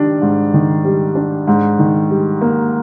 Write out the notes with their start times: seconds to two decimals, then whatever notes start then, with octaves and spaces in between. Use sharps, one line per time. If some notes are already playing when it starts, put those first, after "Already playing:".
Already playing: D#3 G3 D4
0.22 G#2
0.54 D#3
0.85 G3
1.15 D4
1.47 G#2
1.79 D#3
2.10 G3
2.42 A#3